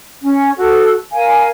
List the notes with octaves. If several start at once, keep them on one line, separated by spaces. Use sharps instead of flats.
C#4
F#4 A4
A#4 F5 G#5